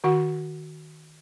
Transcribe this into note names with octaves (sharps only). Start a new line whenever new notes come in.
D#3 F#4 F#5